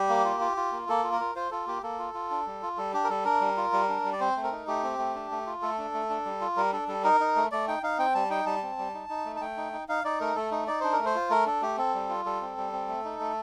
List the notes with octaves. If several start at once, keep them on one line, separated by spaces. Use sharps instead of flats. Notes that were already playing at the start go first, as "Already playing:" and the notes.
Already playing: G3 G4
A#3
F4
F4
F4
A#3
A#3 A4
F4
A#4
F4
F4 C5
F4 A4
A#3 G4
A#3 A4
F4
F4
D4
G3
F4
G3 A4
D4 G4
A#4
G3 A4
D4 A#4
G3
F4
G3
D4
G3
D5
C4 C5
A3
A#4
D#4
A3 G4
C4
A3
D4
A3
F4
A3 A4
D4
A3
D4
G3
F4
G3 A#4
D4 A4
G3 A4
D#4 A#4
D#4
A3
A3 D5
D#4 G5
D#4 F5
C4 G5
G3 A5
D#4 G5
G3 A5
C4
G3
D#4
D#4
A3
A5
A3 G5
D#4
D#4
D#4 F5
D#4 D5
A3 A#4
A3 A4
D#4
D#4 D5
D4 C5
A#4
A3
C5
F4
A3 A#4
D4 A4
A3 G4
C4 A4
G3
F4
G3 A4
C4
G3
C4
A3
D#4
A3